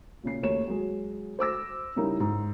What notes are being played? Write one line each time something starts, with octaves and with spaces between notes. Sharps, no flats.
A#2 C#3 C7
D#2 A3 C#5 E7
F#3 G#3
C5 D6 E6 A#6
C#3 G3 D#4 E4 A#4
G#2